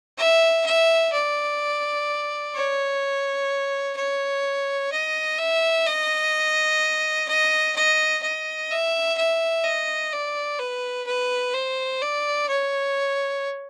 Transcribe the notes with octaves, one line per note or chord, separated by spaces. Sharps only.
E5
E5
D5
C#5
C#5
D#5
E5
D#5
D#5
D#5
D#5
E5
E5
D#5
D5
B4
B4
C5
D5
C#5